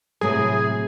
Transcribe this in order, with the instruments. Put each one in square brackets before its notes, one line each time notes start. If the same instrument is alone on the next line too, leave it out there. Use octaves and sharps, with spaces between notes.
[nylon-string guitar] A2 C3 F#3 [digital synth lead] G#4